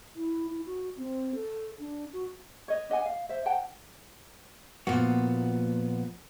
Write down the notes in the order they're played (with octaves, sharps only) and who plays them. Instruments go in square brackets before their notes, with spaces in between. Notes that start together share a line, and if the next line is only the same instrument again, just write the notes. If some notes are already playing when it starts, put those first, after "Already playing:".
[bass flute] E4
E4
F#4
C4
A4
D4
F#4
[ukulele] C#5 D#5
D4 D#5 F#5 G#5
F5
C5 E5
F#5 G5 A5
[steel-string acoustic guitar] A#2 B3 [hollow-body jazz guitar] F3 A#3 F#4